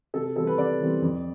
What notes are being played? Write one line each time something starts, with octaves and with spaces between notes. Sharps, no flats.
C3 A4
E3 G3 C4 A4
B4
C3 D5
E3 G3 C4
F2